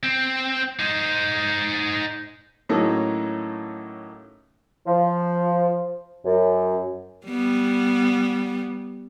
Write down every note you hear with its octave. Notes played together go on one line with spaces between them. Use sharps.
C4
D#4 C5
A2 F#3 A3 A#3 C#4 D#4
F3
F#2
G3 B3